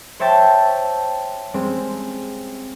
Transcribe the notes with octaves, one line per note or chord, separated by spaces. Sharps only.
C5 C#5 E5 G5 A5
G3 G#3 C4